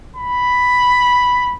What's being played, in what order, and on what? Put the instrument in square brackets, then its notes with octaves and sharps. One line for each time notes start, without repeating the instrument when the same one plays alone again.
[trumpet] B5